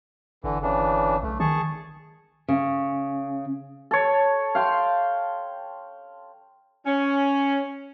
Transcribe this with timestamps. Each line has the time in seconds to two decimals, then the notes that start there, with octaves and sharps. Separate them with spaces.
0.44 G1 D3 E3
0.62 C#3 E3 D4
1.23 B1 A3
1.40 D#3 G#4 A5 C#6
2.48 C#3
3.91 A4 C#5
4.55 F5 G5 C6
6.86 C#4